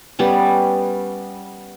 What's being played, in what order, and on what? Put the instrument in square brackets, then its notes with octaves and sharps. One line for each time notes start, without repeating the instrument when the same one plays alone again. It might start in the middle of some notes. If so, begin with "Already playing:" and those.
[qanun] G3 B3 C#4